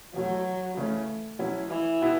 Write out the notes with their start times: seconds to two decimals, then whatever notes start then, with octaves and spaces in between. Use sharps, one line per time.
0.14 E2 B2 F#3 A3
0.77 C#3 E3 A3 C#4
1.39 B2 F#3 C#4 E4
1.70 E3
2.02 B2 B3 E4